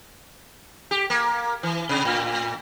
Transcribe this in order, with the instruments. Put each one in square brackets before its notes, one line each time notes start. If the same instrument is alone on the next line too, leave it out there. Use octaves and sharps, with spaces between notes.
[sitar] G4
A#3
E3
C3
A2